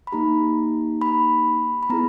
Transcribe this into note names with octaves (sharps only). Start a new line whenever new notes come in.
B5
A#3 D#4 G4 A#5
B5
B5
B3 E4 G#4 A#5